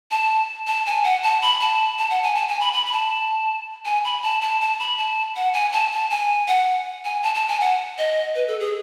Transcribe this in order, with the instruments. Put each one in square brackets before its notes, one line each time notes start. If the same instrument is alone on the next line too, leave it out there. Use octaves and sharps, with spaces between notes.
[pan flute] A5
A5
G#5
F#5
A5
B5
A5
A5
F#5
G#5
A5
G#5
B5
B5
B5
A5
G#5
B5
A5
A5
A5
B5
A5
F#5
G#5
A5
A5
G#5
F#5
G#5
A5
A5
G#5
F#5
D#5
B4
A4
G#4